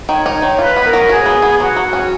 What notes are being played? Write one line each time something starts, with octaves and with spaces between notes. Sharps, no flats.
D#3 C#5
D#4
D#3
F4 B4
B3
A#4
F#3
F#4 G#4
B3
B3
F#3 F#4
F#3
C#4